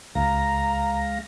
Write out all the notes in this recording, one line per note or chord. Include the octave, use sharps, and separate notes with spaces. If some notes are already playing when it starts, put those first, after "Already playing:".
C#2 G#3 F5 A#5 A#6